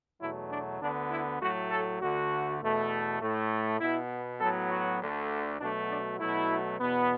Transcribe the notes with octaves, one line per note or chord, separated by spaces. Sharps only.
E2 B2 F#3 A3 E4
D4
D2 D3 B3 D4
E4
A2 F#3 A3 F#4
A4
D2 D3 A3 F#4
E2 B2 A3
A2 A3
B2 B3 E4
A2 F#3 B3 A4
F#4
D2 D3 A3
B2 F#3 A3 D4
D4
B2 F#3 A3 E4
E2 B2 B3